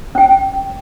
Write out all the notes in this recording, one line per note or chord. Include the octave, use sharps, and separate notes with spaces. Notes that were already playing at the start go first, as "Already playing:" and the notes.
C#4 G5